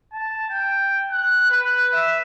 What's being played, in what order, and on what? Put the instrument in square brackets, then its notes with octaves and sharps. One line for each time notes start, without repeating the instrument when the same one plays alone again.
[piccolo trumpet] A5
G5
F#6
B4
E5